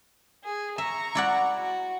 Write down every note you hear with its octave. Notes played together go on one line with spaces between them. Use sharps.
G#4
E5 A#5 C#6
E4 D5 F#5
F#4